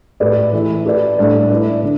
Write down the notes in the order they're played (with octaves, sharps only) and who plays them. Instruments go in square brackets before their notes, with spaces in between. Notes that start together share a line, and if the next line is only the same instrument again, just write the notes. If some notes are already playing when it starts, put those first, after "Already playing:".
[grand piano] A2 A3 G4 B4 D5
E3 A3 E4
A3 G4 B4 D5
A2 G3 D4 A4 D5
A3 E4 B4 D5
D3